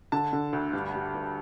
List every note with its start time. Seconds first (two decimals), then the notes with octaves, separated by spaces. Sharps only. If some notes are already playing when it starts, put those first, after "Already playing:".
0.12 D3 A5
0.33 D3
0.53 D2
0.73 G2
0.94 G3
1.15 G2